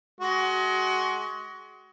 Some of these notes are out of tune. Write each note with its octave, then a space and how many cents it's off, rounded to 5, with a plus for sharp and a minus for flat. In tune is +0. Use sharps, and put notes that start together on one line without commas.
G#3 +30 F#4 +25